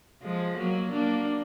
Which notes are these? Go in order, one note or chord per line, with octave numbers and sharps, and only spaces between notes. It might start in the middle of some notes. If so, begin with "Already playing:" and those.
F3 G#3
F#3 A#3
A#3 D4